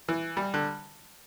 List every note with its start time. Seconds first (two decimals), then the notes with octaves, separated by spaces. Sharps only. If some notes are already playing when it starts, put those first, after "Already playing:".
0.08 E3
0.37 G3
0.54 D3